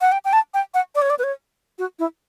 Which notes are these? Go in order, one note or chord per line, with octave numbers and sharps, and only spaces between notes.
F#5
G5
G5
A5
G5
F#5
D5
C#5
D5
B4
C#5
F#4
E4